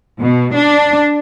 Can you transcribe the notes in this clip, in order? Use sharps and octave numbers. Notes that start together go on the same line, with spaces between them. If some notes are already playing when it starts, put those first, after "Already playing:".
B2
D4